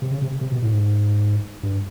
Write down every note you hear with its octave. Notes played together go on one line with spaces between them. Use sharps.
C3
C#3
C3
C3
B2
A2
G#2
G2